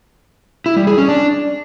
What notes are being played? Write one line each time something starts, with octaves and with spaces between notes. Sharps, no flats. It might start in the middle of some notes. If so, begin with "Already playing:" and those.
E4
G3
G#4
C#4
D4